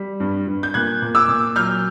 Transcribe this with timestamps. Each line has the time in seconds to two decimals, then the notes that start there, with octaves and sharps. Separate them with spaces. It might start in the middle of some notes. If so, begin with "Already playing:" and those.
Already playing: G3
0.20 G2
0.47 G2
0.63 G6
0.74 A#2 F#6 G#6
1.02 A#2
1.15 D6 E6
1.28 A#2
1.56 F#3 F6 G6